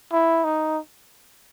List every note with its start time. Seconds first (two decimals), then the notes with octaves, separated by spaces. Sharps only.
0.12 E4
0.45 D#4